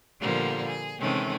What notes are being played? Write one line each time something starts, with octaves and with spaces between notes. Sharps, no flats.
A#2 D3 F3 G3 A#3 B3
G#4
C3 D#3 E3 G#3 A3 C#4